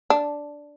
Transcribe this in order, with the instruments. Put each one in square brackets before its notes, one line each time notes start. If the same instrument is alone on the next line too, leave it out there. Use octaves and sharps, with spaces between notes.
[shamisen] D4